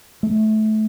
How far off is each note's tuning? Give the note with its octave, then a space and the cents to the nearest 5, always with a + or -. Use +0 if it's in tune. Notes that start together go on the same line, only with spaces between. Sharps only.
A3 -20